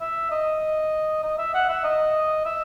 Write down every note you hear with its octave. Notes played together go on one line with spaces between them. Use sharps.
E5
D#5
D#5
E5
F#5
E5
D#5
E5